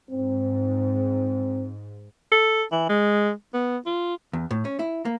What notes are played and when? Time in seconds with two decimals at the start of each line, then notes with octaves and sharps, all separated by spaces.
0.11 G#2 C4
2.32 A4
2.72 E3
2.89 G#3
3.54 B3
3.86 F4
4.33 E2
4.51 A2
4.65 C#4
4.79 E4
5.05 A#3